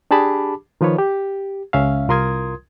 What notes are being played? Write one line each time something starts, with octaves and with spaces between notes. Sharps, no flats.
D4 G4 G#4 A5 B5 D6
D#3 F3 F4 B4 C#5
G4
C#2 C#4 E5 F5
C2 F4 A#4 C6 D#6 G#6